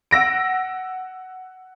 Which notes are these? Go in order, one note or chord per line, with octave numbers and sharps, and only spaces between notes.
F#5 E6 A#6 D7